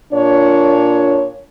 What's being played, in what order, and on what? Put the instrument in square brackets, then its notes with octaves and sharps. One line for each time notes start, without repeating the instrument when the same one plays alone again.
[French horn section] A#2 D4 C#5